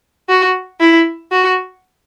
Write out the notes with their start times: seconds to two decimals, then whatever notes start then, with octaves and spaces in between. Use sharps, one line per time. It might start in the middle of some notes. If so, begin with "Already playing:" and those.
0.29 F#4
0.80 E4
1.32 F#4